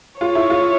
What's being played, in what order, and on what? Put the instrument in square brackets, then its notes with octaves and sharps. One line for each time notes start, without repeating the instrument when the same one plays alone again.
[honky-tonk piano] F4 [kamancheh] C#5
[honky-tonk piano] E4
F4